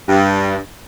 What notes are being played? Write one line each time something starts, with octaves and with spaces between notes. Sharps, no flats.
G2